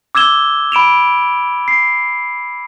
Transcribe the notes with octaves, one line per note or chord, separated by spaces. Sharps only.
D6 E6 G#6 E7 G7
B5 D7 E7 F7
C7